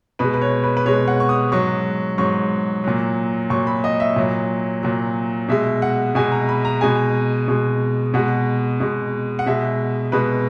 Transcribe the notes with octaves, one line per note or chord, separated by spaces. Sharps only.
B2 G#3 B4
B4
C#5
B4
B4
B2 G#3 C#5
F#5
C#6
D#6
G#2 F#3 C#6
G#2 F#3 C#6
A#2 F#3
A#2 F#3 C#6
B5
D#5
E5
A#2 F#3
A#2 F#3
B2 G#3 E5
F#5
B2 G#3 G#5
A#5
B5
A#5
B2 G#3 G#5
B2 G#3
B2 G#3 F#5
B2 G#3
F#5
B2 G#3 E5
B2 G#3 B4